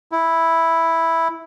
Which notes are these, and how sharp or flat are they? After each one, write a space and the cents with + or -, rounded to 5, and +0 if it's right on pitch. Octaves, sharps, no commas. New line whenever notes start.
E4 -5